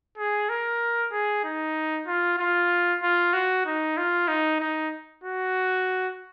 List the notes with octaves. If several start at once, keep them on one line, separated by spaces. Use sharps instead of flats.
G#4
A#4
G#4
D#4
F4
F4
F4
F#4
D#4
F4
D#4
D#4
F#4